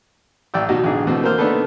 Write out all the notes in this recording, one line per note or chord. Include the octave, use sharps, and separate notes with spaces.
A1 D5 G5 E6
B2 F#3 D#4 F#4 G4
A1 D3 G#4
B2 D3 E3 A3 C4
A#3 A#4 C5 F6
A3 B3 D4 D#4 A4 B4